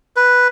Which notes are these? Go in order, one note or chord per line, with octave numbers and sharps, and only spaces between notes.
B4